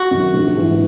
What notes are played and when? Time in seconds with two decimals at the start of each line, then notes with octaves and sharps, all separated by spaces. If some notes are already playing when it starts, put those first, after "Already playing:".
Already playing: F#4
0.11 F#2 D#3
0.34 A#1
0.57 G#2 E3